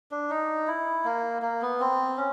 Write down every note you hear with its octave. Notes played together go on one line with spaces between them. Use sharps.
D4
D#4
E4
A#3
A#3
B3
C4
C#4